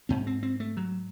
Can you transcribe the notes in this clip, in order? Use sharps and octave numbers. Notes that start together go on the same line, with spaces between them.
G#2 C4
C4
C4
A3
F#3